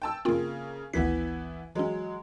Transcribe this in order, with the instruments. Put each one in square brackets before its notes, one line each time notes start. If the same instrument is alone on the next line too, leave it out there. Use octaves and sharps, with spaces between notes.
[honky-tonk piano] G5 A5 E6
[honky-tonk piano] C#3 A#3 [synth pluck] C4 F4 G5
[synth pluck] G#1 D2 B6 [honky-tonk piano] E3 B3 E4
[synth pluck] E3 C#4 [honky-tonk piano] F#3 G#3